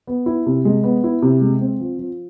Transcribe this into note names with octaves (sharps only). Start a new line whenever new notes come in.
B3
E4
C3
G#3
B3
E4
C3
G#3
C4
F3
F3